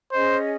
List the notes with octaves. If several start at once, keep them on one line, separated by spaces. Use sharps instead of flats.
C#4 G#4 C5 D#5